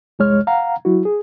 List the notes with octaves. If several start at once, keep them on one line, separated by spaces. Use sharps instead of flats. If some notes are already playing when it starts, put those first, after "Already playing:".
C2 F2 G#3 C#5 F6
F5 F#5 A#5
F#3 E4 F#4
G#4